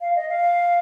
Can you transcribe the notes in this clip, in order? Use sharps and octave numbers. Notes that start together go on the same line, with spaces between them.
F5
D#5
F5